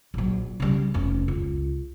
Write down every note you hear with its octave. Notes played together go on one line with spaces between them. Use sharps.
A#1 F#3
C#3 G3
F1 C#4
C#2